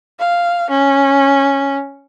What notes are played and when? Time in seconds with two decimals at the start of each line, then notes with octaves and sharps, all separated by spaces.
0.20 F5
0.71 C#4